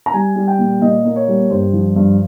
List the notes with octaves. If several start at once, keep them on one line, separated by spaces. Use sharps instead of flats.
A#5
G3 G#5
G3
G5
A#2
A#2 D#5
A#3
C#5
G3
G2 C5
F3
G2